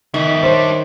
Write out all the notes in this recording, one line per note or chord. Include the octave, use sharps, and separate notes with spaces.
F2 B2 D#3 E5
G3 D4 C5 C#5